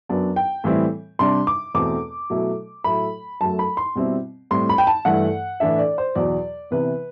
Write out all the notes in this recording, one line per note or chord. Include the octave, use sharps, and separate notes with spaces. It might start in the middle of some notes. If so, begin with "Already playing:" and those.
F#2 F#3 B3 D4
G5
A2 E3 G3 C4 E4
C3 G3 D4 C6
D6
E2 B2 A3 C4 D6
B2 F#3 A3 E4
A2 F#3 A3 E4 B5
F#2 F#3 A3 A5
B5
C6
B2 G3 C4 E4
A2 G3 C4 C6
B5
G5
A5
G2 E3 A3 E4 F#5
A2 E3 A3 D4 E5
D5
C5
E2 B2 F#3 D5
C3 E3 B3 B4